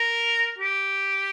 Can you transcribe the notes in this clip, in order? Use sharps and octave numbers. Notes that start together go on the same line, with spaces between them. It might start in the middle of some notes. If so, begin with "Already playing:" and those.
Already playing: A#4
G4